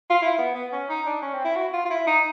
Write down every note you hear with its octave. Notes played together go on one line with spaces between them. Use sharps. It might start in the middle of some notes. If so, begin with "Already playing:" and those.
F4
E4
B3
B3
C#4
D#4
D4
C#4
C4
E4
F#4
F4
F4
E4
D#4